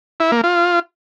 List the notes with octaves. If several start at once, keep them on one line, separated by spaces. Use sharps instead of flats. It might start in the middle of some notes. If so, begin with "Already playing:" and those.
E4
A#3
F4